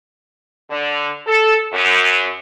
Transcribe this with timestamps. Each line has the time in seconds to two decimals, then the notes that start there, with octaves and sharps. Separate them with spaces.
0.70 D3
1.27 A4
1.73 F#2